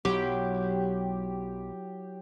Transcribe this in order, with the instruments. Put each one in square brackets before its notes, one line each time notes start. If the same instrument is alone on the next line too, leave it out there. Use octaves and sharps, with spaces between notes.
[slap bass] B1 [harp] F#3 E4 [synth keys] G4